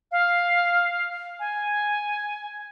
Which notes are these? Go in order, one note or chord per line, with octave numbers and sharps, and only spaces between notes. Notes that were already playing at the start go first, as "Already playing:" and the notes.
F5
G#5